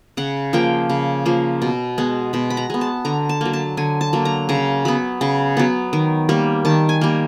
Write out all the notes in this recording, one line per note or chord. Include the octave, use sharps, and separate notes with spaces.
C#3 F#5
F3 A#3 G5
C#3
F3 A#3
B2
G#3 B3
B2 B5
B5
A#5
G#3 B3
A5
D3 A#5
A5
F#3 A#3
A5
D3 G#5
A5
F#3 A#3
A#5
C#3 A#5
F#3 B3 B5
C#3
F#3 B3
D#3
G3 A#3
D#3 A5
G#5
G3 A#3